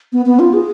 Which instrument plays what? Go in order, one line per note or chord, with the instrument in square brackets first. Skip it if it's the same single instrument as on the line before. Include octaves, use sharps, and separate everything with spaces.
[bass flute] B3
B3
F4
G#4